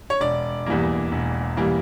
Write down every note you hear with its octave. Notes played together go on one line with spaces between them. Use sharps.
C#5
E1 D5
E2 E3 G3 A#3
E1
E3 G3 A#3